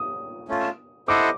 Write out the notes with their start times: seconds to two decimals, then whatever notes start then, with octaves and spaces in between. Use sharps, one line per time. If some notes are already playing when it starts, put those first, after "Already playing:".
Already playing: D#6
0.48 A3 C#4 F4
1.08 E4 A4 C5 D#5 F#5 D6